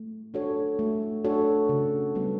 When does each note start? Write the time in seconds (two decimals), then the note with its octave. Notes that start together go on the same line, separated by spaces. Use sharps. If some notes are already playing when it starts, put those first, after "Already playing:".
Already playing: A3
0.34 D4 F#4 A4 C#5
0.79 A3
1.25 D4 F#4 A4 C#5
1.69 C#3
2.15 G3 B3 F#4 A4